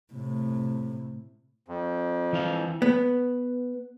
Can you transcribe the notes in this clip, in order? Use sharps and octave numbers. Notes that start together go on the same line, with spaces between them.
A2 C3
F2
E3 E4 F5
B3